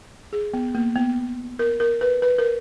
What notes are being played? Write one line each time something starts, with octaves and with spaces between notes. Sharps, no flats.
G#4
B3
A#3
B3
A#4
A#4
B4
B4
A#4